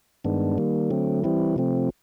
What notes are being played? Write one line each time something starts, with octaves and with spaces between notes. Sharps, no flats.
G2 D#3 G#3 B3 D4
D#3 G3 A#3
D3 F#3 A3 C4
E3 G3 C4 E4
C3 F3 A3 C4